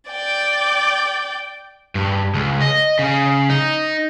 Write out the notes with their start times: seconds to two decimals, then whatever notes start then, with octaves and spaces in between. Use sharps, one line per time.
0.11 D5 G5
1.95 G2
2.34 C#2
2.62 D#5
2.99 C#3
3.50 D#4